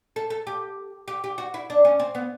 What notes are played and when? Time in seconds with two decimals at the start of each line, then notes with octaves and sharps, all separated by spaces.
0.16 A4
0.30 A4
0.47 G4
1.08 G4
1.24 G4
1.38 F#4
1.54 E4
1.70 D4
1.85 C#4
1.99 C4
2.15 B3